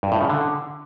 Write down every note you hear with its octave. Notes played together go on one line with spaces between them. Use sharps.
G2
A2
C#3
D3